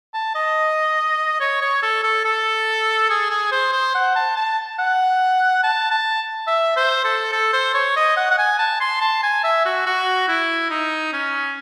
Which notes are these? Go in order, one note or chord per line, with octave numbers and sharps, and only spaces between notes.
A5
D#5
C#5
C#5
A4
A4
A4
G#4
G#4
C5
C5
F#5
A5
A5
F#5
A5
A5
E5
C5
A4
A4
C5
C#5
D#5
F#5
F#5
G#5
A5
C6
A5
G#5
E5
F#4
F#4
E4
D#4
C#4